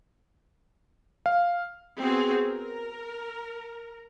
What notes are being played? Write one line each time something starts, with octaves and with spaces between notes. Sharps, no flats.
F5
B3 C4 F#4 G#4
A#4